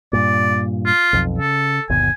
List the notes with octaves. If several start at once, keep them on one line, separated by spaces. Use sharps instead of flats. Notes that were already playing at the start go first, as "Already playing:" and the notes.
G2 A#2 D5
F4
B1 F2
C#3 A4
G1 D#2 B2 G#5